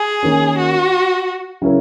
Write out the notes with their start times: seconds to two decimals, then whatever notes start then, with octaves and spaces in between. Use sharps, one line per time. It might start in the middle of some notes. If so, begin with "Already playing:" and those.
Already playing: G#4
0.23 D#3 A#3 C#4
0.57 F#4
1.62 C#3 F#3 C#4 E4 A#4